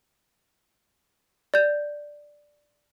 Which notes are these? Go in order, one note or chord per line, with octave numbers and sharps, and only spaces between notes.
D5 G6